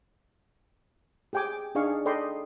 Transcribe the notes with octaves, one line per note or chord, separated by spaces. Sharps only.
G4 G#4 G5 G#5 D6
D4 D#4 G#4 D5 F5 C#6
A4 D5 D#5 G5 B5 C6